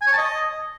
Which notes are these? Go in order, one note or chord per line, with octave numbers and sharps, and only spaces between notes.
G#5
C#5
A5
D#5